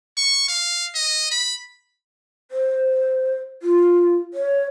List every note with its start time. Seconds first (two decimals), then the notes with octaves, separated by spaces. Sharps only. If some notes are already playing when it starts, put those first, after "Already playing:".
0.17 C#6
0.48 F5
0.95 D#5
1.31 B5
2.51 C5
3.63 F4
4.34 C#5